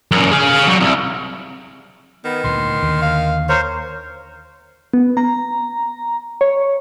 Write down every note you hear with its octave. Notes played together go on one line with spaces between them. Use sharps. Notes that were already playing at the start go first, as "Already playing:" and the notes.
F#2 A#2
G#4 F5
F#3 G3
C2
D#3 B3
D2 A#2 C6
D#2 D3
F5
A#4 C5 C#5
B3
A#5
C#5